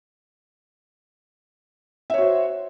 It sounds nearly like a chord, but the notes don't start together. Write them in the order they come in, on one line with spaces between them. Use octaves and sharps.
E5 C#5 F#4 C5